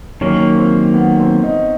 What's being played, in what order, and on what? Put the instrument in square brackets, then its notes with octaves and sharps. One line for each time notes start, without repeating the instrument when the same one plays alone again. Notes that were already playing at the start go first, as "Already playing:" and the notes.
[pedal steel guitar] D#3 F#3 A#3 [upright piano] C#4
[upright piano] C4
B3
C4
D#4